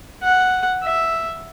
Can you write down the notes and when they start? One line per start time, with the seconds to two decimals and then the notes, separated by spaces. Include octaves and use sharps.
0.23 F#5
0.84 E5